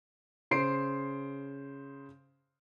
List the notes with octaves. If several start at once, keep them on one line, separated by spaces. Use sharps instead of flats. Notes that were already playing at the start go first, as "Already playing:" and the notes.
C#3 C5 C7 D7